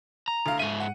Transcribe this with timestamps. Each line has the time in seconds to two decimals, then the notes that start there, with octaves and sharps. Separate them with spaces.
0.28 A#5
0.46 D2 F5
0.59 G#2 E5 D#7
0.80 F#5